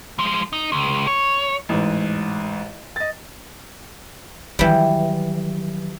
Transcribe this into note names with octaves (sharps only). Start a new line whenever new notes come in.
F3 G#3
D#4
C#2
C#5
A1 G#2
D#5 A6
D#3 E3 F#3 G3